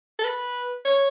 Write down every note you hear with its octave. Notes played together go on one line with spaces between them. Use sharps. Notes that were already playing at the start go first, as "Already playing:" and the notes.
A4
B4
C#5